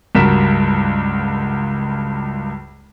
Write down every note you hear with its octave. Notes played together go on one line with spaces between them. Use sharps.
C#2 G2 F#4 A#4 B6 E7